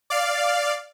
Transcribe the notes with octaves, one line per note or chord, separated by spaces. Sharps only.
D5 F5